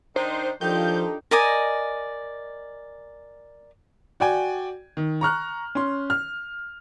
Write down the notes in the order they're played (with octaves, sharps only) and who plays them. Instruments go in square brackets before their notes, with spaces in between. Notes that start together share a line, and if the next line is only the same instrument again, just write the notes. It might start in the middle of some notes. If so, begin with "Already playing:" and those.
[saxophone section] D#3 D4 D#4 [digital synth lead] C5
[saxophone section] D#3 D#4 G4 [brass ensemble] F3 [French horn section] D4 F4 A4 [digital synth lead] G6
[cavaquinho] A#4 D5 D#5 G#5
[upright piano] F#4 D5 G5 G#5
D#3
A#5 C#6 F6 F#6
C#4 C6
F6